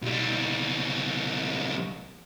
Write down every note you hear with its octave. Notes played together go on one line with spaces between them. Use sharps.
B1 G3